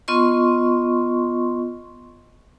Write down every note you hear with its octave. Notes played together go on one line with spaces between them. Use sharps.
B3 F4 D#5 C6 C#6